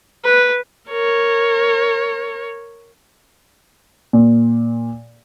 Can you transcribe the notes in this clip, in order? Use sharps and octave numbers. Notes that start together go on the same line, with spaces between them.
B4
A#4 C#5
A#2